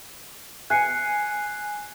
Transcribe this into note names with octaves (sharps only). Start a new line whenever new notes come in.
G#5 F#6 C7 C#7